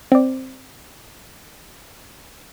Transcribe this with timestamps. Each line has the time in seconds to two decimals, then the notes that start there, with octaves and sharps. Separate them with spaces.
0.12 C4 D5